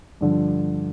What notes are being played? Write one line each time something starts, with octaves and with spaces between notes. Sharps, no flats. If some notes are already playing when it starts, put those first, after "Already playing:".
G2 D3 F3